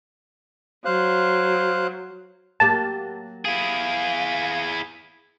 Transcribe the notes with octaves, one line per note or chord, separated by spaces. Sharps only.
F#3 C5 F5 F#6
F#3 A#3 G4 A5
E4 G#4 F5